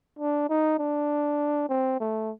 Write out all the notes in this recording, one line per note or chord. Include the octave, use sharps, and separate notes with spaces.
D4
D#4
D4
C4
A3